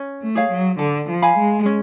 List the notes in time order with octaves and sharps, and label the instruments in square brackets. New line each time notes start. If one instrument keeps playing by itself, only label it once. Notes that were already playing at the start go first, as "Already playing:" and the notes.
Already playing: [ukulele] C#4
[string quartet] A3
[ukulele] G#4 C#5 F5
[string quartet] F#3
[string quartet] D3 [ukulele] A4
[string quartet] F3
[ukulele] F5 G#5 B5
[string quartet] G#3
[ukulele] C#4